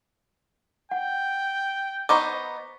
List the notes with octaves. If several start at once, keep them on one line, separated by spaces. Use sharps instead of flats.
F#5 G5
B3 D#4 C5 A#5 C#6 D6